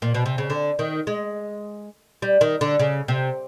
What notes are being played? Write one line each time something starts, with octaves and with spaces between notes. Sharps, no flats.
A#2
B2
C3
C#3
D3
D#3
G#3
G3
D#3
D3
C#3
C3